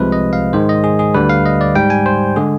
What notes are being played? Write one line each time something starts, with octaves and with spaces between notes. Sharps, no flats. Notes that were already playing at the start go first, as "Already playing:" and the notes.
Already playing: C2 C3 F3 G#3 B4
D#5
F5
G#2 D#3 G#3 C5
D#5
G#4
G#4
D2 D3 G3 B4
F5
D#5
D5
G#2 G3 G5
G#5
C5
D3 G#3 G#4